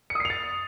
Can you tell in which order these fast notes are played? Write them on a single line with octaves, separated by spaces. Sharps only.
C#7 D#6 C7 F7 A6